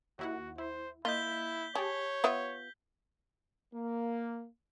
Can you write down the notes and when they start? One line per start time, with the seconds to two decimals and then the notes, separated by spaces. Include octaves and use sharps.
0.19 D#2 E4 F#4 F#5
0.58 E4 C5
1.05 A#3 E4 F4 D#5 G6 B6 G7
1.75 G4 G#4 C#5 A5
2.24 B3 F4 E5
3.74 A#3